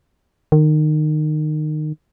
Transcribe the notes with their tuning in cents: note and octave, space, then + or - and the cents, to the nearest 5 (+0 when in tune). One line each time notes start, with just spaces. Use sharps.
D#3 -25